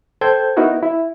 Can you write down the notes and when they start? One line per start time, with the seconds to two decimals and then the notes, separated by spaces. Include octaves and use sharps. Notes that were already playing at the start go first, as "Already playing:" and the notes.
0.21 A4 C5 G5 G6 G#6
0.57 B3 D#4 E4 F#4 A#4
0.83 E4